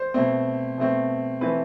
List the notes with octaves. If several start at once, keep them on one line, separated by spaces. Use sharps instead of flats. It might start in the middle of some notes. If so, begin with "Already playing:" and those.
Already playing: C5
B2 A3 C4
B2 A3 C4
E3 A3 C4 B4